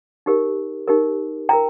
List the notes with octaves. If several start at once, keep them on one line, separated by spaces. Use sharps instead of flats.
D#4 G4 A#4
D#4 G4 A#4
F4 A#4 G5 A#5